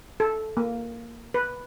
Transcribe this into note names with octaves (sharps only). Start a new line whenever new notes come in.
A4
A#3
B4